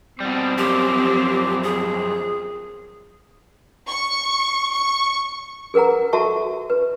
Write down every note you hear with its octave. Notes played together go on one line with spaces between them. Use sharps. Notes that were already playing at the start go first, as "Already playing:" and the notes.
B2 G3 C4
F#2 F3 G4
G#4
C#6
C#6
G#4 A#4 B4 F#5 A#5
F#4 A4 E5 A5 C#6
B4